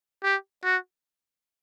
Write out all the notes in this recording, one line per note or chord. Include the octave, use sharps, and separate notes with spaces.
G4
F#4